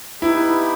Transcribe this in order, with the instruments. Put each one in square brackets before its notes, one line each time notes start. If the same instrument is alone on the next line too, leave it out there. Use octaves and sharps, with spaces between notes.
[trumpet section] B3 D#4 G4 B4 [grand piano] E4